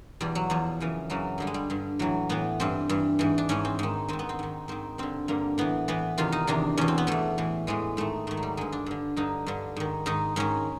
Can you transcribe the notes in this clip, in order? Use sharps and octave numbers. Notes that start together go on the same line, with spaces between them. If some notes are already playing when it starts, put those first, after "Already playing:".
E2 B2 G3
F#3
E2 B2 F3
F#2 C#3 E3
F#2 C#3 E3 F#3
G2 D3 G3
G#3
G3
G2 D3
A2 E3 F#3
A2 E3 B3
G2 E3 C4
G2 E3
G#2 E3
D4
G#2 E3 C#4
C4
G#2 D#3
G#2 D#3 C4
B3
C4
G#2 D#3
G#2 D#3 C4
G2 D3 C4
G2 D3 A#3
A2 E3 B3
A2 E3 B3
E2 C3 D#3 F4
D#4
E2 C3 D#3 D4
E2 B2 C#4
C4
B3
E2 B2 A3
A2 E3
A2 E3 G#3
G#2 D#3 A3
G#2 D#3 A3
F#3
G3
G2 D3 G#3
D4
G2 D3
G2 D3 D#4
G2 D3
G#2 D#3
G#2 D#3 D#4
G#2 D#3 C#4